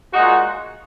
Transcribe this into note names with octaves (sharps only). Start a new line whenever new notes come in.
A#2 G#3 D#4 F#4